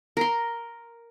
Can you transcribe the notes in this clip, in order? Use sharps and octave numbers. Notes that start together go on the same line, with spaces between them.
A#4 C6